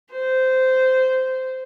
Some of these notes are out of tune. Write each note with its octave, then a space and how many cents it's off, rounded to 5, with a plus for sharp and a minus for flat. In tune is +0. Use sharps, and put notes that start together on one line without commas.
C5 -15